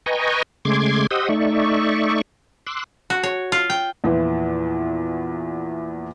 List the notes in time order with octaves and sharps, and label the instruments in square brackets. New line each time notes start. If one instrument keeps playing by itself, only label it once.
[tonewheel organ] B4 D#5 G5 G#5 A#5 C#6
C#3 G#3 A3 C6 D6 G#6
G4 C5 D#5 F#5 D#6 E6
A3 D#4 D5 E5 C#6
C6 D6 E6 F#6
[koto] F#4
C#5
F4
G5
[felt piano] E2 A#2 E3 F3